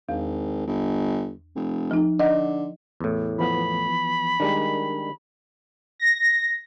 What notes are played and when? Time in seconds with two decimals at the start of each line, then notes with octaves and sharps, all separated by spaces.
0.09 G#1 E2
0.67 G1
1.56 F1
1.91 F3 D#4
2.19 D3 D#5 F#5
3.00 E2 A2
3.39 E3 F3 B3 B5
4.40 D#3 G3 G#3 D4 A#4
6.00 A#6